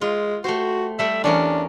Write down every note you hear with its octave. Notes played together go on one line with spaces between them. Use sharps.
G#3 F4
A3 F#4 G4 C5
G3 A3 D5 E5
E2 C#4 D4 A#4